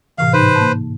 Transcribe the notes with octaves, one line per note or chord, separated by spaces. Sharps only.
A2 C3 E3 F5
G#2 D#4 B4 C5
A#3 A5